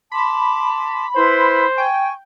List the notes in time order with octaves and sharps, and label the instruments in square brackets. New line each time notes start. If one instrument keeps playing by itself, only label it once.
[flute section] A5 C6 D6 [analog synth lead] B5
[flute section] E4 B4 C6 [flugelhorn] C5
[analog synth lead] G5 [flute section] G#5 C#6